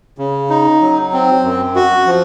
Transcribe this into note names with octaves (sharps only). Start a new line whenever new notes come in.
C#3
D#4
F#3
C4
F#2
F#4
F3